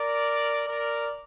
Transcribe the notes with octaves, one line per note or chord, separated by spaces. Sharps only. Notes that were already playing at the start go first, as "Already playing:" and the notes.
Already playing: A#4 D5
A#4 D5